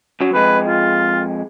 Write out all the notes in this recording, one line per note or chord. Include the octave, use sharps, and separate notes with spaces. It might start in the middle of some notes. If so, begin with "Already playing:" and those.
F#2 F#3
F2 G#3 B4
F4